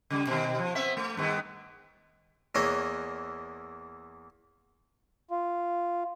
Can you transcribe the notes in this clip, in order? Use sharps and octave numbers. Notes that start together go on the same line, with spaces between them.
C#3 G3
B2 D#3
F3
B3 C4 E5
A3
G2 D#3 B3
E2 E3 A#3 C#5 D#5
F4